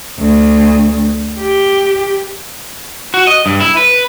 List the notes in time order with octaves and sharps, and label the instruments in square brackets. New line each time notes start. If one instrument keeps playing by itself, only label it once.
[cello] D2
G4
[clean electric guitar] F#4
D#5
G2
E4
B4